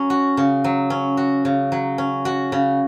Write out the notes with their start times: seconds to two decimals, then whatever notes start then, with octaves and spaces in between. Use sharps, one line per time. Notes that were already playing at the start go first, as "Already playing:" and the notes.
Already playing: F#3 C#4
0.10 F#4
0.37 C#3
0.64 F#3
0.90 C#4
1.17 F#4
1.45 C#3
1.72 F#3
1.98 C#4
2.25 F#4
2.52 C#3